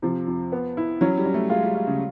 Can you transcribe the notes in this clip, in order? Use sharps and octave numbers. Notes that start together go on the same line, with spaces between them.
C3 F3
F2
B3
E4
F#3 C#4
G3
C#4
A3
G#3 F4
G3
F4
C#3